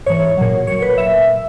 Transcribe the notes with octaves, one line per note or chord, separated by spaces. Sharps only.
G#2 E3 C#5
A#2 F#3
A#2 F#3 C#5
B4
A#2 E5